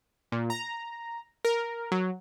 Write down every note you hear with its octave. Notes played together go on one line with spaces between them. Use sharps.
A#2
A#5
A#4
F#3